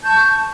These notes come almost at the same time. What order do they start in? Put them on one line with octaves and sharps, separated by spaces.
A5 G6 C#6